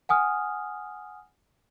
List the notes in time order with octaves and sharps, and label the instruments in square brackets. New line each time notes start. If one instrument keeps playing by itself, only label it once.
[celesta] F#5 G#5 D#6 F6